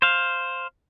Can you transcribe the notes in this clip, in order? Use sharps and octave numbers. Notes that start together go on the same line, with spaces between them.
C5 F5